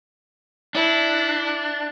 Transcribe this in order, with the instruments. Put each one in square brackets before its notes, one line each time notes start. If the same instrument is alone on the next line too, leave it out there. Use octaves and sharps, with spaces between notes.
[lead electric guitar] D4 [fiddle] E4